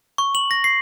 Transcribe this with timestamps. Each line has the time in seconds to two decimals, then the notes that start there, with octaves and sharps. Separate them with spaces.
0.18 C#6
0.35 F#7
0.51 A#6
0.64 C7